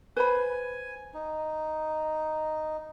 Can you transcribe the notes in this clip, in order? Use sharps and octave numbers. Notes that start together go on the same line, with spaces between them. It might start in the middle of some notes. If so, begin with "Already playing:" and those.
B4 C5 G#5 B5
D#4